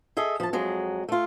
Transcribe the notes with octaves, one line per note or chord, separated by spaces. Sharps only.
G#4 A4 D#5 E5
F3 A5
F2 F#3 G#3
A3 F4